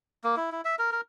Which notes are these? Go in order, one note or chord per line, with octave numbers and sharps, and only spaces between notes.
A#3
E4
E4
E5
A#4
A#4